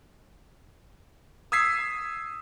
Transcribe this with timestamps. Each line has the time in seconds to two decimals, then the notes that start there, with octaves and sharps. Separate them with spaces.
1.52 D#6 E6 G#6 B6 C7